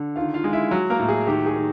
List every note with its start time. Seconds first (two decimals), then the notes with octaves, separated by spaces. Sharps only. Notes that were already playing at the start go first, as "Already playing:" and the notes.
Already playing: D3
0.16 D#3 F4 F5
0.34 F4 F5
0.44 G#3
0.53 E4 E5
0.71 F#3
0.90 A#3 A#4
0.99 A2
1.09 G#4
1.27 D#3 G4
1.46 G#4
1.56 D#3